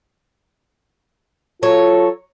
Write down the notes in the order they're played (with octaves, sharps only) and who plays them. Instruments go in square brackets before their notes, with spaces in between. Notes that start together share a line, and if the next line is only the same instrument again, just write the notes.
[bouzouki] F#3 C#5 [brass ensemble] F4 A4